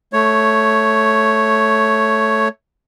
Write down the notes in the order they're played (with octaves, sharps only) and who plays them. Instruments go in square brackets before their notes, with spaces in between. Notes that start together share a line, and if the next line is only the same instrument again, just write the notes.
[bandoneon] A3 C#5